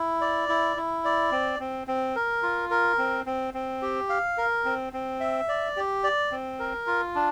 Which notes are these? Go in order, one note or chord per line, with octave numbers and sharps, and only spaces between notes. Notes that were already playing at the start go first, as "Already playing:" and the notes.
Already playing: E4
D5
E4
E4
D5
C4
C4
C4
A#4
F4
A#4
C4
C4
C4
G4
F5
A#4
C4
C4
E5
D5
G4
D5
C4
A#4
F4
D4